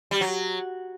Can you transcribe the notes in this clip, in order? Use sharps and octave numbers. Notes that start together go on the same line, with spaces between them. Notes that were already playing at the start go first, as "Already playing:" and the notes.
G3
F#3